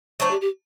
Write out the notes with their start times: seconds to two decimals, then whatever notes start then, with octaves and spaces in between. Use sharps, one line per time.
0.20 F#3 A3 D4 C5
0.31 G4
0.41 G4